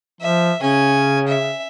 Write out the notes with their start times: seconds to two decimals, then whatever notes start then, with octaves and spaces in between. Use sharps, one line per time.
0.21 F3 E5
0.61 C#3 C#4 G#5
1.27 E5